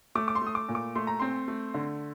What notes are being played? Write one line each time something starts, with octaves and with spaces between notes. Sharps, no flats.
A3 D6
D6
C6
A3
D#6
D6
A#2
D6
A3 C6
A#5
C4 C6
A3
D3